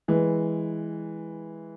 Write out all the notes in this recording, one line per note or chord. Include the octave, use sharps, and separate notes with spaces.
E3 G#3